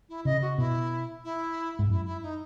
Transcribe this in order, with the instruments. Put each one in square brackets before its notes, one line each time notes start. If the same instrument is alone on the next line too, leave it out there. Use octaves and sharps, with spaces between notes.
[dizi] E4
[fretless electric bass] C#3 [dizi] D#5
[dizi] F#4
[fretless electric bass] B2 [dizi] E4
[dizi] E4
[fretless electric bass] G#2
[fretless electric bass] F#2 [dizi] E4
[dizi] E4
D#4